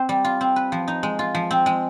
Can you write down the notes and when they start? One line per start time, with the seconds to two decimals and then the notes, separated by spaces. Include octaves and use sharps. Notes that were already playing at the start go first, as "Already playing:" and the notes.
Already playing: C4 C5
0.09 G3
0.25 F4
0.41 C4
0.56 B4
0.72 F3
0.88 D#4
1.03 G#3
1.19 F4
1.35 F3
1.51 C4
1.66 G#3